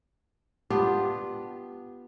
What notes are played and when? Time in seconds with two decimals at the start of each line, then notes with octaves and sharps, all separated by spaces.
0.70 B3 D4 F4 G4